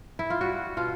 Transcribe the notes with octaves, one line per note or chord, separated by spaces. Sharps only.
E4
F4
G3 F#4
B2 F4